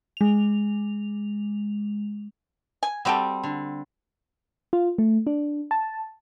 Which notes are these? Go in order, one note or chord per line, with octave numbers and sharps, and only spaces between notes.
G#3 F7
G#5
G3 C4 F#4 G4 A4
D3
F4
A3
D4
A5